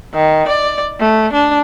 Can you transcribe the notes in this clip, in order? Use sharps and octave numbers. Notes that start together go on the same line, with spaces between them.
D#3
D5
A3
D4